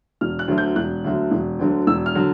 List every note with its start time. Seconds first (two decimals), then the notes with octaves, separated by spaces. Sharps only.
0.21 E1 F6
0.39 F#6
0.48 D2 D3 F#3
0.58 G6
0.76 E1 F#6
1.04 D2 D3 F#3
1.31 E1
1.59 D2 D3 F#3
1.87 E1 E6
2.06 F6
2.15 D3 F#3